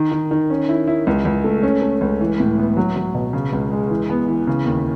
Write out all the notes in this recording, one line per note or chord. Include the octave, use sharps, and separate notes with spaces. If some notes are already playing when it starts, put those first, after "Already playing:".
Already playing: D#3
D#3
D#3
C#4
E4
E4
C#2
C#2
A3
C#4
A3
C#2
E3
A2
B3
F#3
F#3
B2
C#3
C#2
G#3
E3
B3
E3
C#3
D#2